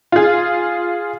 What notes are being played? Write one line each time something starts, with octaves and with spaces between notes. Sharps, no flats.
F4 G#4